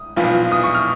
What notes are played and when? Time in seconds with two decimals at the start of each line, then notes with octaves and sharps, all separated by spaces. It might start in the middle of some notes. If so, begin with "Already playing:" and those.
Already playing: D#6
0.16 B1 A#2 F3 B3 F4
0.52 D#6
0.63 C#6
0.74 F6